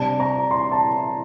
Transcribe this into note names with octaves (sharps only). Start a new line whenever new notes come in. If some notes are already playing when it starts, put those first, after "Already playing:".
Already playing: C3 G3 D4 A5
A#5
C6
A5